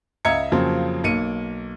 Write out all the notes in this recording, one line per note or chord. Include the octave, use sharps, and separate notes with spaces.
C#2 D#5 E5 A#5 G#6 C#7
F2 C#3 F3 F#3 A#3 C4
B1 A#3 C#7 D#7